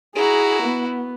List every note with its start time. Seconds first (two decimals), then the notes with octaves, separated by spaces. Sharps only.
0.15 E4 F#4 G#4 A#5
0.63 B3